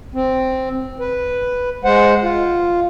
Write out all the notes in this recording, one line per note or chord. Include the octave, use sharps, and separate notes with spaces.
C4
B4
G#3 C5 F#5
F4